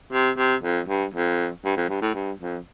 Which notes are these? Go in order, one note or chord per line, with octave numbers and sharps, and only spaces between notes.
C3
C3
F2
G2
F2
G2
F2
G2
A2
G2
F2